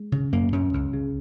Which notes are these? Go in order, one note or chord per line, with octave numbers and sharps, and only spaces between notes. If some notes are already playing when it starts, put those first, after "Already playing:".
Already playing: G#3
C#3
F#2 A#3
F#2 C#4
C#2
C#3